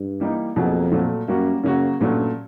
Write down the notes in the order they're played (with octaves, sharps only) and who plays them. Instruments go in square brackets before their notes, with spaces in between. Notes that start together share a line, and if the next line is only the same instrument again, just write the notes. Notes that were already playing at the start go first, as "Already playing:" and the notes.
Already playing: [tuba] G2
[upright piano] E3 G3 A#3 D#4
[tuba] F2 [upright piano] B2 F#3 A#3 D#4 G#4
[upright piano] A#2 F#3 A3
[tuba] F#2 [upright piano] G3 A#3 C#4 F#4
[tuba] F#2 [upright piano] C#3 F#3 A#3 C#4 F#4
[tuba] G2 [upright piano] A#2 F#3 A3 C#4